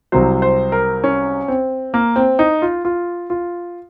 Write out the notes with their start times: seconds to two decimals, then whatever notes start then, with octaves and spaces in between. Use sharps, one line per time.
0.12 C2 C3 F#3 C5
0.42 C5
0.72 A#4
1.04 C#4
1.48 C4
1.94 A#3
2.16 C4
2.39 D#4
2.62 F4
2.85 F4
3.30 F4